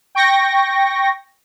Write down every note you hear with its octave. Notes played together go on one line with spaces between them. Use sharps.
G5 C#6 A#6